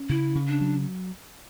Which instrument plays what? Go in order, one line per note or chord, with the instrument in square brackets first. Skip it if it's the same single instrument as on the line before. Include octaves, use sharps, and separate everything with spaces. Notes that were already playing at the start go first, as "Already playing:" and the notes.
Already playing: [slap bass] C#4
[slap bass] C#3 [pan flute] E4
[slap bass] C#3
[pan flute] D4
[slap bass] F#3